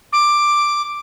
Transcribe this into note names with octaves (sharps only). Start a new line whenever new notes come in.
D6